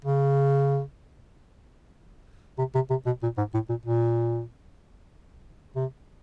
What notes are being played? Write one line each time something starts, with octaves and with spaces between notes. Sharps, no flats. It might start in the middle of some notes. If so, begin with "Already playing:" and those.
C#3
C3
C3
C3
B2
A#2
G#2
A2
A#2
A#2
C3